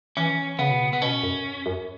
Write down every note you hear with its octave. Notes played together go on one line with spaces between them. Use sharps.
E3 C#4
C#3 B3
B2
C#3
B3
B2 C#4
F#2
F#2